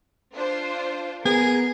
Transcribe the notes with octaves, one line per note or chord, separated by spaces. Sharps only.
D4 F4 C5
B3 G#4 A#4